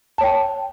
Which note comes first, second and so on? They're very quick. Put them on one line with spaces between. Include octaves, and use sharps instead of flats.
A5 C#5 G5